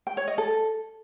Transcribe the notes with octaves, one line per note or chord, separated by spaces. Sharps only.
G5
C#5
D#5
A4